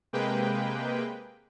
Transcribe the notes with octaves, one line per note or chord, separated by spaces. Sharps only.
C3 G#3 A#3 B4 G5